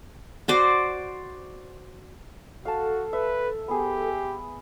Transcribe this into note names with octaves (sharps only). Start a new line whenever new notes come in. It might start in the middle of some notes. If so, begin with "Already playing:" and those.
F#4 C5 D5
F#4 A4 F5 A5
B4 E5
B3 G4 G#4